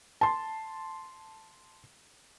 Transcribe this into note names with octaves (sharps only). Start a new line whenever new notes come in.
A5 C6